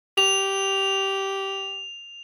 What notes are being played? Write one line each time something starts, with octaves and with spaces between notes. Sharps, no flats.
G4 F7